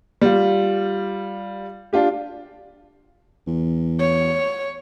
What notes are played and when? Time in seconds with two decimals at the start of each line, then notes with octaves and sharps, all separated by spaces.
0.21 G3 F4
1.93 D4 F4 G4
3.47 E2
3.99 C#5